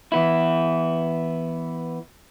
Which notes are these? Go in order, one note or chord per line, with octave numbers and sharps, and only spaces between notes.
E3 B3 E4